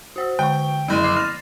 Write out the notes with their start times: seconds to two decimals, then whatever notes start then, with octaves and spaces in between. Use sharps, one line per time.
0.16 F#4 C5 E6
0.39 D3 G5 C#6
0.88 F#1 F3 E4 D#7
1.04 D6 E6 C7
1.16 F6 A6 A#6